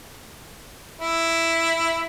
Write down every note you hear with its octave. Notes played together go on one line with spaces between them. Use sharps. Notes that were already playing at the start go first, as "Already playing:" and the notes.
E4